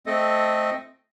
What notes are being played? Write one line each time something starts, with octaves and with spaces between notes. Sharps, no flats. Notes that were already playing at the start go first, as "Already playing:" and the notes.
A3 C4 A4 D#5